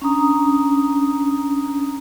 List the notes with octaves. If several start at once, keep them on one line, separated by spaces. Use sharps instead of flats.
C#4 D4 A#5 D#6